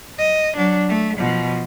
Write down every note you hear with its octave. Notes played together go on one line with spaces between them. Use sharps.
D#5
F#3 D4
A3
B2 F3